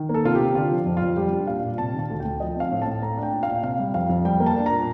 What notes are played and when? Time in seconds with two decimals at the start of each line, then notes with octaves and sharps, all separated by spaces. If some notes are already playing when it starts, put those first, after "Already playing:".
Already playing: D#3
0.09 A#3
0.14 A4
0.25 C3 F4
0.35 C3 G4
0.55 D3 F4
0.71 F3
0.86 F2
0.97 F4
1.02 F2
1.17 G3 G4
1.32 D4
1.47 A#2 F5
1.63 A#2
1.78 C3 A5
1.94 D#3 A5
2.10 D2
2.20 G5
2.25 D2
2.40 F3 D#5
2.56 C4 F5
2.71 A2
2.82 A2 A5
3.02 A3 A#5
3.17 D4
3.23 G5
3.32 A#2
3.43 F5
3.48 A#2
3.63 C3 F5
3.79 G3
3.94 F2 F5
4.09 F2
4.25 G3 G5
4.40 A#3
4.46 A5
4.56 D4
4.66 A#2 A#5